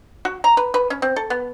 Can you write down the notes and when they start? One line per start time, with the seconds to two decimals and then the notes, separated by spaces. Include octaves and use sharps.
0.25 F#4
0.44 A#5
0.57 B4
0.74 B4
0.90 C#4
1.02 C4
1.16 A4
1.30 B3